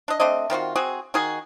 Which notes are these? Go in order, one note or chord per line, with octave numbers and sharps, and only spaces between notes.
D4 D#5
A3 C4 D4 D#5
D#3 C4 F4 F#4
C4 F#4 G#4
D#3 D#4 F#4 G#4